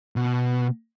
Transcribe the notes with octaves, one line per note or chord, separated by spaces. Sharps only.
B2